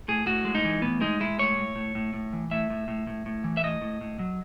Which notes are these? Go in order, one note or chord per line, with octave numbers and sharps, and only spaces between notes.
A2 G#4
A2 F#4
G#3
D#4
E3
A2 B3
G#3 D#4
G#3 E4
A2 C#5
A2
A2
A2
A2
E3
A2 E5
A2
A2
A2
A2
E3
E5
A2 D#5
A2
A2
F#3